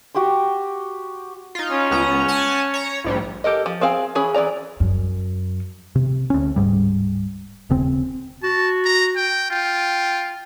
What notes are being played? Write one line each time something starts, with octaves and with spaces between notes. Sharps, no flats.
F#4 G4 G5 C6
D#4 F4
C#4
C#2 B3 A#5
F#5 G#5 A5
C#5 A#5
A#1 G#2 G3
G4 A4 A#4 D#5
F3
C4 G#4 F5 G5
E3 C#4 G#4 B5
E3 G#4 D5 A#5
F#2
C3
D2 C#4
D1 F2 G#2 G3
D#1 C#3 C4
F#4 A5
A#5
G5
F4 G5